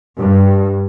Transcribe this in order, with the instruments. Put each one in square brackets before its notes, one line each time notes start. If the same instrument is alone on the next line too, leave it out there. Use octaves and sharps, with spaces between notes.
[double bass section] G2